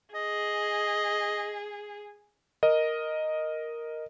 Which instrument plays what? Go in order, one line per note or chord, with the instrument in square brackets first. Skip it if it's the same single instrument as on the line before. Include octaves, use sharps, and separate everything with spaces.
[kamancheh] G#4 [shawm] D#5
[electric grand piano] A#4 D#5